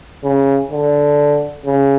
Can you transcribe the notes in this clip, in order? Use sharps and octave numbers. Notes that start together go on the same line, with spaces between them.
C#3
D3
C#3